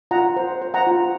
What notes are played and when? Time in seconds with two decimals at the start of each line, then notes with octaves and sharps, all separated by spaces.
0.11 F4 F#5 A#5
0.36 C5
0.62 C5
0.74 F#5 A#5
0.87 F4